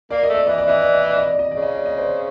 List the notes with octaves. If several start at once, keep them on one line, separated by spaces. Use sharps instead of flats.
A#3 D5
D#5
A3
D5
E3 D#5
D5
E3 D#5
D5
D#5
D5
D#5
D5
D#5
C#3 D5
D#5
D5
D#5
C5 D5